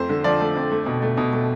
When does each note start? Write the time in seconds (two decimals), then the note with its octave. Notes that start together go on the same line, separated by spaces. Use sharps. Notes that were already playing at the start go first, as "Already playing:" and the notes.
Already playing: F2 A3 C5
0.09 D3
0.24 F3 D5
0.40 A3
0.56 F2
0.71 A3
0.86 B2
1.02 A3
1.17 B2
1.33 A3